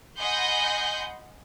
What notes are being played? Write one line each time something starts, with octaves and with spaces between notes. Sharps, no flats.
D#5 F#5 G#5 B5 C6 G6